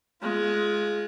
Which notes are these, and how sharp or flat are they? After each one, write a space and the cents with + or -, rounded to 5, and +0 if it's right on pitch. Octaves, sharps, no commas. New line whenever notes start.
G#3 +15 F4 +0